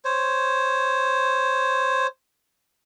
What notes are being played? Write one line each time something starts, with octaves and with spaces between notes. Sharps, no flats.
C5 C#5